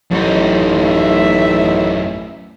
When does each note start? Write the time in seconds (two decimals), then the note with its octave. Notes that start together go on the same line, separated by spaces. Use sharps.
0.11 A1 F#2 D#4
0.84 E5